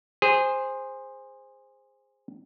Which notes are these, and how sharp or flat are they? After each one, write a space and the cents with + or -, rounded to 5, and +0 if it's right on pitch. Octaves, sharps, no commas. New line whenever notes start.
G#4 -20 C5 +0